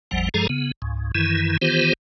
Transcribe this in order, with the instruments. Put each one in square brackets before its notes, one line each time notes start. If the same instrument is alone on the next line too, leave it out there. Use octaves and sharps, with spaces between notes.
[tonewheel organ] G#1 E2 F3 G3 F#5
G2 F3 G#3 G#4 A4 A#5
C#3 B3
C#2 G#2
F#2 D#3 E3 E4
D#3 E3 B3 F4 G4 C5